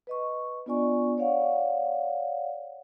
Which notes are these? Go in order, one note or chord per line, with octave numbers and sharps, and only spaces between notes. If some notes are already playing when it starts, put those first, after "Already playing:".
B4 D#5 C#6
B3 D4 F4 D5 G#5 C#6
C#5 D5 F5 F#5